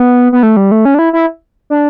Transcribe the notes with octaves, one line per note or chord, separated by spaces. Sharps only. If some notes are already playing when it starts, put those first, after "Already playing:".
Already playing: B3
B3
A3
G3
A3
C#4
D4
E4
E4
D4